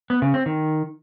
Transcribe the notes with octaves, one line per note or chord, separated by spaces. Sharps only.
B3
C#3
C4
D#3